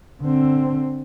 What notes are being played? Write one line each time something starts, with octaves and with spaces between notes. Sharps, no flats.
D3 C4